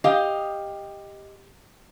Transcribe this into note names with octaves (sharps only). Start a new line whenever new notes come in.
G4 D#5 F5